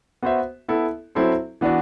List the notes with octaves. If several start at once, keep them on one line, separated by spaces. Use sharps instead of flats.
B3 F#4 C5 E5
B3 E4 A4
F#3 C4 E4 A4 C5
E3 B3 D4 F#4